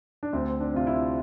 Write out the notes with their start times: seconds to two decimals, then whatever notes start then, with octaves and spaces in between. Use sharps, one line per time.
0.23 D4
0.33 D2 C4
0.60 D4
0.74 C3 F4
0.87 E4